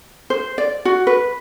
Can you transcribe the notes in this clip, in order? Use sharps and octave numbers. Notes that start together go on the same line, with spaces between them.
C5
D5
F#4
B4